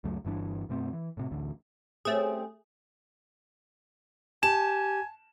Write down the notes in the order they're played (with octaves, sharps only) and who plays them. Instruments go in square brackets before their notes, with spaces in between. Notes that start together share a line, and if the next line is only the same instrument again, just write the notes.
[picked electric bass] C#2 F#2 F#3 A3
G1 G2 E3 D4
F#2 B2 A3 C4
E3
A2 C3
A1 D2 D3
[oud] G3 C4 C#4 [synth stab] A3 G#4
[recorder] G4 [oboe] G#5 [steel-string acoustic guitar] A5 [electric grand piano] E7